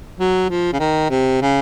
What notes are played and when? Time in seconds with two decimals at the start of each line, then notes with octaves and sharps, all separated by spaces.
0.18 F#3
0.50 F3
0.73 C#3
0.79 D#3
1.10 C3
1.42 C#3